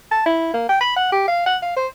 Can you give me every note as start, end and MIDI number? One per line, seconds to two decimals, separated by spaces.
0.11 0.24 81
0.26 0.49 64
0.54 0.68 58
0.69 0.80 79
0.81 0.94 83
0.96 1.11 78
1.12 1.23 67
1.28 1.45 77
1.47 1.57 78
1.63 1.76 77
1.77 1.87 72